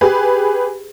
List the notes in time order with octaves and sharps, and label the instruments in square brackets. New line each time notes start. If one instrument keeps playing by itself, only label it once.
[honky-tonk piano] G4 G#4 B4